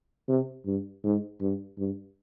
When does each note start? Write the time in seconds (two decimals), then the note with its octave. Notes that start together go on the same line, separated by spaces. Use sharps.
0.28 C3
0.66 G2
1.04 G#2
1.41 G2
1.78 G2